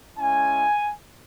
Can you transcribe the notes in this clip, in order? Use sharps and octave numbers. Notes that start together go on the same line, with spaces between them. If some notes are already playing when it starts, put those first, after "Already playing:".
G#3 C#4 E4 G#5